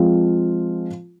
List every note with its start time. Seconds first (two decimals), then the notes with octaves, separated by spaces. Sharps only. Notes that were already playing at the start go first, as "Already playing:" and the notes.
Already playing: F3 G#3 C4 F4